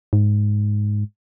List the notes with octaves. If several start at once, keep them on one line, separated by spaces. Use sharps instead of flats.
G#2